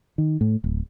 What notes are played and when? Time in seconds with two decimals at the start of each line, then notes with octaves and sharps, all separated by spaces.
0.18 D#3
0.41 A2
0.64 D1